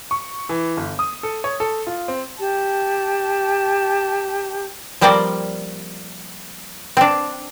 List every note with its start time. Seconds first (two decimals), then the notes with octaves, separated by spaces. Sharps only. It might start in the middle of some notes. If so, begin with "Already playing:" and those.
0.11 C#6
0.49 E3
0.77 G1
0.99 D#6
1.23 A4
1.44 C#5
1.60 A4
1.87 F4
2.08 C4
2.39 G4 A5
5.01 F3 G3 A#3 C4 C5 D5
6.97 C4 D4